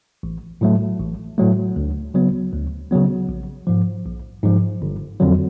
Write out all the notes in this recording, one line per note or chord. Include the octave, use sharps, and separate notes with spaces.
A1
A2 F#3 A3
A1
A2 F#3 A3
D2
C#3 F#3 B3
D2
C#3 F#3 B3
A#1
G#2 F3
A#1
G#2 F3
G1
F2 D3 F#3